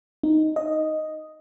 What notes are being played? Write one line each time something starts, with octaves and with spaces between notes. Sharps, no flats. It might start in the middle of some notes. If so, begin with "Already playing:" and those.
D#4
D#5